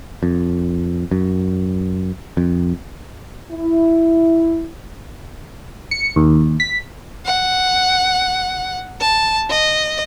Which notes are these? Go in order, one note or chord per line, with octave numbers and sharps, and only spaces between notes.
F2
F#2
F2
E4
C#7
D#2
B6
F#5
A5
D#5